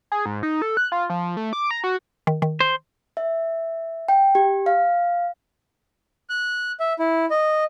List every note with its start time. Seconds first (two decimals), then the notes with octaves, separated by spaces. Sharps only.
0.12 G#4
0.26 G#2
0.43 D#4
0.62 A4
0.77 F#6
0.92 F4
1.10 F3
1.37 A3
1.53 D6
1.71 A#5
1.84 F#4
2.27 D#3
2.42 D#3
2.60 C5
3.17 E5
4.08 G5
4.35 G4
4.66 F5
6.30 F#6
6.80 E5
6.99 E4
7.31 D#5